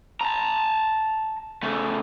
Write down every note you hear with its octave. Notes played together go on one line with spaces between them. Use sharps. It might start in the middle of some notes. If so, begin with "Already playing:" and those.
A5 A#5
C#3 A3